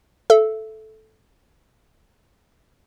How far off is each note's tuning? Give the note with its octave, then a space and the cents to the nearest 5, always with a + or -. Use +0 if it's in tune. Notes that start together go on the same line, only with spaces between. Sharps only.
A4 -10 E5 +20